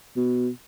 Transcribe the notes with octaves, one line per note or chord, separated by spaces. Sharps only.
B2